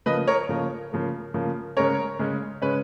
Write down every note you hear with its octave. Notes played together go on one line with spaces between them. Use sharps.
C#3 F3 A#3 B4 D#5
A#4 C#5
C#3 F3 A#3
C#3 F3 A#3
C#3 F3 A#3
C#3 G#3 C#4 A#4 C#5
C#3 G#3 C#4
C#3 G#3 C#4 B4